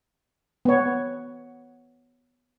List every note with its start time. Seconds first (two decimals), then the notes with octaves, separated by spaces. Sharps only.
0.65 B3 C#5